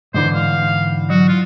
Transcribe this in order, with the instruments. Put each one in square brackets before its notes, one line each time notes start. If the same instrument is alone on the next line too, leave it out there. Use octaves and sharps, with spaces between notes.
[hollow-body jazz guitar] G#2 D3 E3 [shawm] C5
[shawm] F5
[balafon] F#3 [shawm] F#4
[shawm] F4